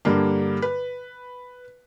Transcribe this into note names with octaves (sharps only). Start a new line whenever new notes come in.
G2 D3 G3 A#3
B4